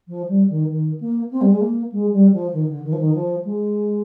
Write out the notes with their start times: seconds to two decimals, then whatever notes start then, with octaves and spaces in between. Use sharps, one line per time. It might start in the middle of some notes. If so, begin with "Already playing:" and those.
0.07 F3
0.28 G3
0.49 D#3
0.70 D#3
1.00 A#3
1.30 C4
1.41 G3
1.51 G#3
1.60 A#3
1.91 G#3
2.12 G3
2.33 F3
2.52 D#3
2.68 D3
2.83 D#3
2.92 F3
2.98 D#3
3.14 F3
3.44 G#3